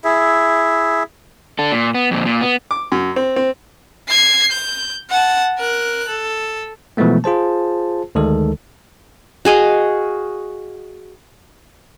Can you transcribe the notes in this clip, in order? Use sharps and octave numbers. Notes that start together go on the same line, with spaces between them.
E4 G#4 E5
D4 A4
A#2
B3
F2 A#2
A#2
B3
D6
F#2
C4
C4
G#6 C7
G6
F#5 A5
A#4 F#6
A4
B2 E3 F3 G#3 A3 B3
F4 G#4 C5 A5
D2 D#3 G#3 A4
F#4 G#4 D#5 F5